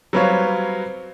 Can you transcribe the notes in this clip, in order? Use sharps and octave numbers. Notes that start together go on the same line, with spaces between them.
F#3 G3 C4 B4 C#5 F5